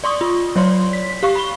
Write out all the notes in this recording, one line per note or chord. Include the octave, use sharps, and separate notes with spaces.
D5 C6 C#6 D#6
F4
F#3 C#5 D5 C6
B6
G4 F5 C#6
B5 G7